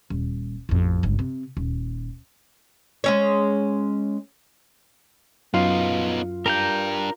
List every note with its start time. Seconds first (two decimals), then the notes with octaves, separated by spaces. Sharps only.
0.10 D#1
0.69 A1 F2
1.03 G1 C#2
1.19 C3
1.57 D#1
3.04 G#3 C#4 C#5
5.54 F#2 B3 D#4 F4
6.46 D4 G4 A#4 A#5 G6